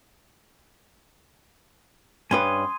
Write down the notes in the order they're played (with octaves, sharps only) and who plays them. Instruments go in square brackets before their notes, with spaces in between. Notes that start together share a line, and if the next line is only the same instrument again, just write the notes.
[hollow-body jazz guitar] G2 C#4 B4 [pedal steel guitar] G#5 C6 D#6